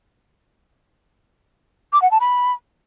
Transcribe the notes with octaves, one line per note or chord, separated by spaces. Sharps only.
D6
F#5
A5
B5